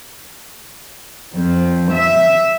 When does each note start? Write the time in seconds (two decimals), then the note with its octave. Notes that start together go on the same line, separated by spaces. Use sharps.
1.33 F2
1.94 E5